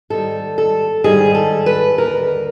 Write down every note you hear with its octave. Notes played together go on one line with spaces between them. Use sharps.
G#2 D#3 G3 A4
A4
G#2 D#3 G3 G#4
A4
B4
D#2 D3 G3 A#4